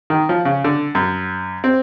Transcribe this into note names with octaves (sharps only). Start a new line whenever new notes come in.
D#3
F3
C#3
D3
F#2
C4